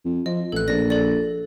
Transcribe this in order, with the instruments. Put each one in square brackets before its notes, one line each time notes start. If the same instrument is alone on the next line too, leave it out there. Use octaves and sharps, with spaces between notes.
[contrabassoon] F2
[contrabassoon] F3 [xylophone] D#5
[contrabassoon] A1 [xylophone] A4 F#6
[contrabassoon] A#1 [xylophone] D5 A#6
[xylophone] A4 D5